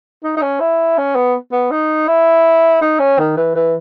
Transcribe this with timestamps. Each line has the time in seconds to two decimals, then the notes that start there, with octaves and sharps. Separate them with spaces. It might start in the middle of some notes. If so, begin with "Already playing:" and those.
0.24 D#4
0.37 D#4
0.42 C#4
0.60 E4
0.98 C#4
1.15 B3
1.52 B3
1.71 D#4
2.08 E4
2.81 D#4
2.99 C#4
3.19 D#3
3.37 E3
3.55 E3